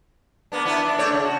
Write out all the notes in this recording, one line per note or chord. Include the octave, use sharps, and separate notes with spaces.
A#3 B3 D4
B3 D4 E4
D4
A3 C#5 D5
C#3
F#4